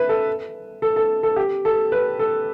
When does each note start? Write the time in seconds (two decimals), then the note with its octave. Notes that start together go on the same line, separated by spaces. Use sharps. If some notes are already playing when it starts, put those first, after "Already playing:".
Already playing: B4 E5
0.09 A4
0.82 A4
0.96 A4
1.23 A4
1.36 G4
1.65 A4
1.92 B4
2.19 A4